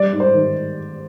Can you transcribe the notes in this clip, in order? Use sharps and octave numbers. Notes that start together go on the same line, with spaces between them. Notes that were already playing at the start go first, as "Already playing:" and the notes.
Already playing: G3 D5
G#2
C5
D#3